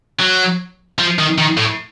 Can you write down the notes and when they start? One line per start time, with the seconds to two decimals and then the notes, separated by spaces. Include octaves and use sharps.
0.20 F#3
0.99 F3
1.19 D#3
1.38 D#3
1.57 A2